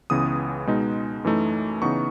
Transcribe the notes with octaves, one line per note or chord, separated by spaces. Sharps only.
C#2 C#3 E3 B3 D#6
B2 G#3 D#4
F#2 E3 A3 D#4
C#3 E3 B3 D#4 C#6